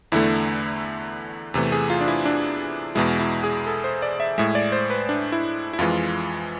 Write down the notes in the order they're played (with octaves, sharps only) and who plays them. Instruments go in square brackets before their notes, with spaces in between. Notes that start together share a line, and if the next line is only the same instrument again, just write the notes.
[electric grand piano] E2 D3 A3 E4
E2 C3 E3 A3
G#4
F4
D4
E4
D4
E2 B2 G#3 E4
E4
G#4
A4
C5
D5
E5
A2 G#3 E5
D5
C5
B4
D4
E4
E4
F2 E3 G#3 F4